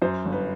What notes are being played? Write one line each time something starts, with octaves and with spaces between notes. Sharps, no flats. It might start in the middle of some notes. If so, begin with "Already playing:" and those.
F#2 C5
G1
B4